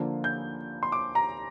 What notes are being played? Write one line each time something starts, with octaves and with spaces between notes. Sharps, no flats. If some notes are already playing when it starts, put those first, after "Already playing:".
Already playing: D3 F3 A#3 D4 F4
G6
C6
D6
A#5